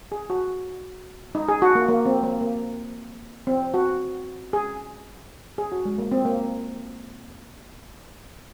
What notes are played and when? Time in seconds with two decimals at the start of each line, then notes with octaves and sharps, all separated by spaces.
0.12 G#4
0.30 F#4
1.35 D#4
1.48 G#4
1.62 F#4
1.75 A#3
1.89 A#3
2.06 C4
2.23 A#3
2.41 A#3
3.47 C4
3.74 F#4
4.53 G#4
5.58 G#4
5.72 F#4
5.85 G#3
5.98 A#3
6.12 C4
6.25 A#3